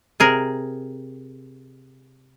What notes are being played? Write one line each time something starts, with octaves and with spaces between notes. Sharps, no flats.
C3 G#4 A#4